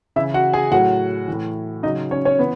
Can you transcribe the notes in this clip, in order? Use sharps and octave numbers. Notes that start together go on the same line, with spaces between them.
C#3 E3 E4 E5
F#4 F#5
G#4 G#5
A2 F#3 F#4 F#5
A2 E3
C#3 F#3 D#4 D#5
C#4 C#5
C#4 C#5
E3 B3 B4